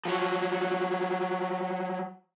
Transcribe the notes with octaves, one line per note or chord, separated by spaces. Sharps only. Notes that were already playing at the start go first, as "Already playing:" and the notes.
F3 F#3